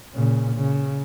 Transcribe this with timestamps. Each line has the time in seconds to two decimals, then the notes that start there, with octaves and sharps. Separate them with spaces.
0.14 A#2 C#3
0.56 C#3